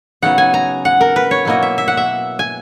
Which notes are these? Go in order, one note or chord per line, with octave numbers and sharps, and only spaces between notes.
C#3 F#3 B3 D#4 F#5
G#5
A#5
F#5
A#4
B4
C#5
B2 F#3 A#3 E4 D#5
E5
E5
F#5
E5
G#5